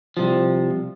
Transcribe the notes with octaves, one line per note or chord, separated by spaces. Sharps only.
C2 C3 F3